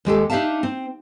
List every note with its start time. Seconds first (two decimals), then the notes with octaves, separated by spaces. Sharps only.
0.05 D#2 G#3 G4 A4
0.30 D4 D#4 G4 E5 F5 A5
0.63 C4